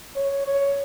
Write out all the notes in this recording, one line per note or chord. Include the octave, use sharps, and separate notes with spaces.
C#5
C#5